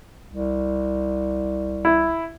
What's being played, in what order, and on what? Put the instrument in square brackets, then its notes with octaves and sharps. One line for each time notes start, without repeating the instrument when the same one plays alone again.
[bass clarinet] C2
[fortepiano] E4